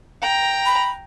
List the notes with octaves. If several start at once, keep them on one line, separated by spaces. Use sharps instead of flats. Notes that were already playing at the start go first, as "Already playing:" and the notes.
G5 A#5
B5